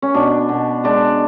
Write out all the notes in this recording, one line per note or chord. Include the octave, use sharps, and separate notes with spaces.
C#4
B2 D4
B2
G#3 D4